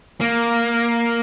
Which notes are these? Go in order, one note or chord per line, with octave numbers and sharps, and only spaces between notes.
A#3